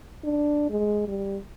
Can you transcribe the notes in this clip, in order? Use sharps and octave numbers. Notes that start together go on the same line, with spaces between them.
D4
G#3
G3